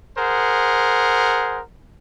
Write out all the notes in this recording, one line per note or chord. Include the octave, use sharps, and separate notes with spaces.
G#4 A#4 C5 F#5